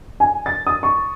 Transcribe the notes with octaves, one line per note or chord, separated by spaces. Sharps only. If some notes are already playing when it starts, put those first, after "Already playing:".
G#5
A6
D#6
C#6